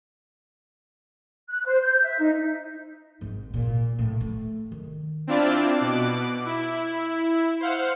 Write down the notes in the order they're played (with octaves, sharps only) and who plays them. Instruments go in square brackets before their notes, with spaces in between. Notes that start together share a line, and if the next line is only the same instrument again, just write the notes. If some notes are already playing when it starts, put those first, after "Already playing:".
[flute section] F#6
C5
G6
E5
D#4
[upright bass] G#1 G#2
A#2
A2
A3
D#3
[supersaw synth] C4 D4 E4 F4 D5 A5
B2 D6 F#6
E4
C5 F5 F#5